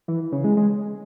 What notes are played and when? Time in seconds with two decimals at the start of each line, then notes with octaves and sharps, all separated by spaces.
0.08 E3
0.32 C#3
0.44 G#3
0.57 G#3